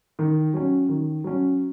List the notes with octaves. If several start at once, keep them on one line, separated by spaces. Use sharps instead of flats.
D#3
F#3 C#4
D#3
F#3 C#4